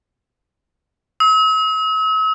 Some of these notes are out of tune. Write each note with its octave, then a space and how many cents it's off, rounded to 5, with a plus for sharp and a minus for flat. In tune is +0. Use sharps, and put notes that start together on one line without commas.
E6 -45